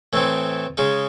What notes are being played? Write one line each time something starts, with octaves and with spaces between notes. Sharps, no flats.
A2 E3 A3 C4 D#4
C#3 G#3 D#4